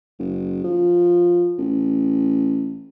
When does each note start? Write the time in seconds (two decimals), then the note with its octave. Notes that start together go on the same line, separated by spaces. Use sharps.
0.19 F#1
0.64 F3
1.58 A1